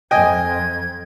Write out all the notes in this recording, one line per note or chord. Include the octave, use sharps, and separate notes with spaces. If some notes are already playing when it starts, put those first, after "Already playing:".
F2 D#5 G5 G#5 G#6